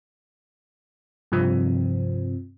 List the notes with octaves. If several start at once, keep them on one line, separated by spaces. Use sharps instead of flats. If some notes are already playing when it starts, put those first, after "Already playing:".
G2 C3 F3 C4